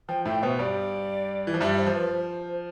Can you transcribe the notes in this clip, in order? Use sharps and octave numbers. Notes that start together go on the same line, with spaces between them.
F3 G5
A2 A3 G5
B2 B3 C5
G2 G3 D5
E3
F3
G2 G3 E5
C5
F3
B4
C5